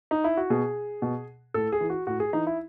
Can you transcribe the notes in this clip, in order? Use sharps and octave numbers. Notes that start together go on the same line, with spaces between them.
D#4
E4
F#4
B2 G#4
B2
A2 A4
G#4
E3
F#4
A2 F#4
G#4
E3 D#4
E4